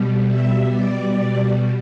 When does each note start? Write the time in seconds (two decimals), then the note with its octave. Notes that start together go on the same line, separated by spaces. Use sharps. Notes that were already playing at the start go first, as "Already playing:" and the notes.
Already playing: B2 G3
0.28 E5
0.69 D5